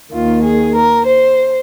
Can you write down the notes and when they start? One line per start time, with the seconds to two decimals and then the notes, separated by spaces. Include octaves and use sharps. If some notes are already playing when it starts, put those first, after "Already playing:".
0.12 D#2 D#3 F4
0.43 G#4
0.74 A#4
1.05 C5